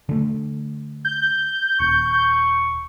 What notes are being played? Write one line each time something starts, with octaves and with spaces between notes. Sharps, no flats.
D3 A3
G6
D#1 C#6